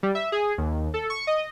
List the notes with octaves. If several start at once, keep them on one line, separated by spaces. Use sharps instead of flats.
G3
E5
G#4
D#2
A4
C#6
D#5